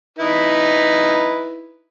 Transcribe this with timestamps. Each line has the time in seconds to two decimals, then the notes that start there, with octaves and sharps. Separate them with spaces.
0.18 D#4 E4 B4